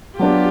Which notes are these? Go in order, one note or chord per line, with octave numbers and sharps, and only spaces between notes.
F#3 B3 D4 F4 G4